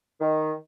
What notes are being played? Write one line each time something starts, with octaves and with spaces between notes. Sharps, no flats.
D#3